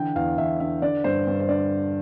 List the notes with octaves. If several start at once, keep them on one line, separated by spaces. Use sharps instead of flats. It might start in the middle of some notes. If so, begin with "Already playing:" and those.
Already playing: D3 E3 G5
E2 F5
E2 E5
D3 E5
D3 D5
G2 C5
G2
C5
D3 D5